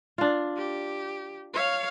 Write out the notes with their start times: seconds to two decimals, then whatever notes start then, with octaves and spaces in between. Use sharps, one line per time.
0.18 D4 F4
0.57 G4
1.54 C#5 F5